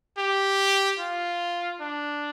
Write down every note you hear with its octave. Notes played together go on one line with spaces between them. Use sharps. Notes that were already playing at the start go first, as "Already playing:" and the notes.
G4
F4
D4